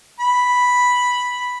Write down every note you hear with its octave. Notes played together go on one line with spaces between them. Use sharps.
B5